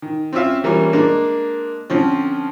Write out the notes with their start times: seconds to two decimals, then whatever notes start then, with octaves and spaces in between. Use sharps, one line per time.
0.02 D#3
0.33 C4 C#4 F4 E5 F5
0.64 E3 G3 A#3 C#4 F4 C#5
0.93 G#3 A#3 D4
1.90 D3 F3 C4 C#4